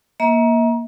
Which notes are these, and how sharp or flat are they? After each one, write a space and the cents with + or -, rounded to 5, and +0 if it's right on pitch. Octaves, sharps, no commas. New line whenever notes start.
A#3 +10 E5 -40 A#5 +20